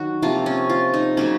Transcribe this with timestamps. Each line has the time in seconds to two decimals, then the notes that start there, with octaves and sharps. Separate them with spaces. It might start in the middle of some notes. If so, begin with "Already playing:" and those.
Already playing: D#3 F#3 F#4
0.22 C3 F3 A#3 F4
0.46 C#4
0.70 F4
0.94 D#4
1.17 C#3 F#3 A#3 C#4